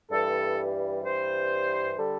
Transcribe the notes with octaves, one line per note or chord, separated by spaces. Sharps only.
G2 E3 G3 A4
G2 E3 G3 C5
D3 G3 A4